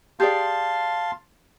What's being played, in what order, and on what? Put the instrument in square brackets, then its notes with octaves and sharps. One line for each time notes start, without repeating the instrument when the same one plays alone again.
[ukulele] G4 G#4 D5 [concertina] F5 A5 C6